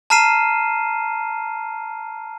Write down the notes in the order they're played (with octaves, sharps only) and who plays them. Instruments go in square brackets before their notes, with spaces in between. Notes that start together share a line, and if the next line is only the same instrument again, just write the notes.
[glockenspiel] A5 A#5 F6 C7 D#7 E7